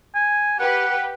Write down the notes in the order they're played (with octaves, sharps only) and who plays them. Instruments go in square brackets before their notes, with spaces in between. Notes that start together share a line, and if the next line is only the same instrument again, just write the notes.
[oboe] G#5
[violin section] G4 B4 [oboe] F#5